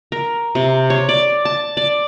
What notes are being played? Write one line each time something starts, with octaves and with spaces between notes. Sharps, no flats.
A#4
C3
C#5
D5
A5
D5